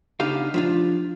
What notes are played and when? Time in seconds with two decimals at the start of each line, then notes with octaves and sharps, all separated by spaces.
0.20 C#3 B3 D4 D#4 G4 F5
0.54 F3 D4 F4